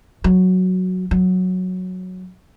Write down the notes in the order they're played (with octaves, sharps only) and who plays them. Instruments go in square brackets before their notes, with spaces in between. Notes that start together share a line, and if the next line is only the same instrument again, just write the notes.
[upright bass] F#3
F#3